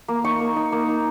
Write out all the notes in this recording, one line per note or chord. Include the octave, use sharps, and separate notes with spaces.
A#3
D#4 C#6
A#3
D#4
A#3
D#4